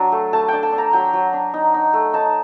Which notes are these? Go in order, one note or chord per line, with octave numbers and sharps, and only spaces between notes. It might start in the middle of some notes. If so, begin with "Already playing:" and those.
Already playing: F#3 D4
A3
A3 A5
D4 G5
A5
D4
A#5
F#3 G5
F#3
D4
D#4
D#4
A3
D#4 A5